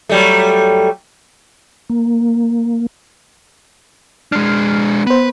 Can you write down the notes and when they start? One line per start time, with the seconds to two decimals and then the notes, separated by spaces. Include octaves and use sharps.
0.09 F#3 G3 A3
1.90 A#3
4.32 G#3 D4 F6 C7
5.07 B3 B4 C5